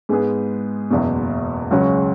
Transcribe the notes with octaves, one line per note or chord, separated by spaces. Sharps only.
G#2 G#3 B3 G#4
F#1 E2 B2
C#2 C#3 F#3 C#4 F#4